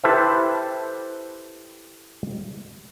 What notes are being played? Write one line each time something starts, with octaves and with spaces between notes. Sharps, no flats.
E4 G4 A4 B4 C5 E5